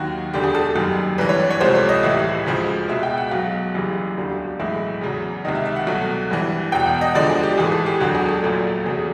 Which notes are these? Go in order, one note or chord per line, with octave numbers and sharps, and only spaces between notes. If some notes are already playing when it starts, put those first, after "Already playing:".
Already playing: D#2 D#3 F#3 F#4
E1 D2 D3 G4
G#4
A4
F#1 F#2 D#3 G3
G#1 G2 E3 B4
C#5
D5
C#5
C#2 C3 F3 A3 C5
C#5
D#5
A1 A2 E3 G3 E5
D2 C#3 F3 G#3
C#2 B2 G#3 E5
G5
F#5
B1 B2 F#3 F5
F#1 F#2 C#3 E3 G3
E1 D2 D3 G3
B1 A2 E3 G#3 E5
E2 C#3 F#3
C#2 C3 D#3 D#5
E5
E5
F#5
C2 B2 F#3 A3
G#1 G2 E3
E1 E2 B2 G5
F#5
D#5
D2 D3 F3 G#3 D5
G#4
G4
A1 G#2 E3 A3 G#4
A4
G4
E1 D2 D3 F#3 F#4
G#4
A4
A#1 A#2 F#3 A3
E2 C#3 F#3 A3 G#4